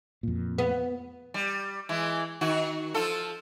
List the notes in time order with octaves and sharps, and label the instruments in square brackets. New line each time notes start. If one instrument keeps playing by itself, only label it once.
[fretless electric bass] F2 A#2
[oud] B3
[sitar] G3
E3 G#3
D#3 F#4
F3 F4 A4